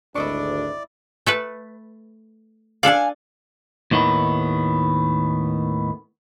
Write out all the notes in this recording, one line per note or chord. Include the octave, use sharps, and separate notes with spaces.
G#1 D2 D4 E4 D5 D#5 C#6
A3 A4 B4
D4 A4 D5 F5 G#5
D#2 A2 D#3 A3 B3